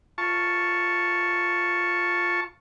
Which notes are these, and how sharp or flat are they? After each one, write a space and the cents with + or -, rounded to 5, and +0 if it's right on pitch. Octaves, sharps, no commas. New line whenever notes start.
F4 +0 A5 +0 C#6 +0